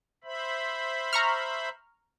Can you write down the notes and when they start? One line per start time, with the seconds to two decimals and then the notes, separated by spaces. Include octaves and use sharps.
0.24 C5 E5 B5
1.13 A#5 C#6 F6